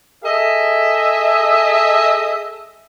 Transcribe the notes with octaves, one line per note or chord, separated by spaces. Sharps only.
G#4 A4 D#5 E5